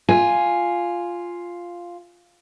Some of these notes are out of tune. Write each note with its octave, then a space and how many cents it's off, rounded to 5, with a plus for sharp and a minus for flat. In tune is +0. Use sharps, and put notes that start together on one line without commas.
F4 +0 G#5 +0